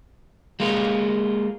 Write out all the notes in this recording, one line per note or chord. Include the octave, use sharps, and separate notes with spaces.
G#3 A#3 F4